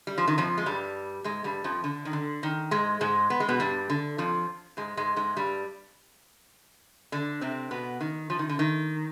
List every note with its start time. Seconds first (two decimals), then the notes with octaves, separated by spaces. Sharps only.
0.07 G3
0.18 F3
0.27 D#3
0.38 F2 F3
0.58 G#3
0.66 G2 G3
1.24 G#2 G#3
1.44 G2 G3
1.64 F2 F3
1.84 D3
2.05 D#3
2.13 D3
2.43 D#3
2.71 G#2 G#3
3.01 G#2 G#3
3.30 B3
3.40 G#3
3.49 B2 B3
3.60 G2 G3
3.90 D3
4.18 F2 F3
4.77 G#2 G#3
4.97 G#2 G#3
5.16 G#2 G#3
5.36 G2 G3
7.12 D3 D4
7.41 C3 C4
7.71 B2 B3
8.01 D#3
8.30 F3
8.39 D#3
8.49 D3
8.59 D#3